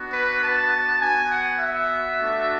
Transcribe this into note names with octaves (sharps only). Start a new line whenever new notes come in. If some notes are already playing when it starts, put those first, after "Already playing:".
Already playing: B3 D4 F#4
B4
A5
B3 F#4 G#5
F#5
E5
A3 D4 F#4